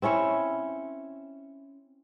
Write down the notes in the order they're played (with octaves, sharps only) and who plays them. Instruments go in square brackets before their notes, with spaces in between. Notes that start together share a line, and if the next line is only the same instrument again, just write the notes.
[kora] C4 C#4 E4 C#5